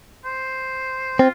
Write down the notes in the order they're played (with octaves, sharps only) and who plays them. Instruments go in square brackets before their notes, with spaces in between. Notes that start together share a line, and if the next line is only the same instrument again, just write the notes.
[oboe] C5
[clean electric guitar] C4 [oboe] F4